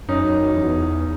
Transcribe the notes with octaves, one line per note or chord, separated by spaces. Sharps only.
F#2 C#4 D#4
E2